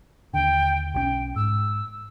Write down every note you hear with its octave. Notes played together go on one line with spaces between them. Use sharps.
D#2 D3 G5
B1 E3 C#4 G5
G#2 E6